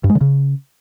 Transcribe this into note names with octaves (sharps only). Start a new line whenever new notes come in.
G2
G#3
D3
C#3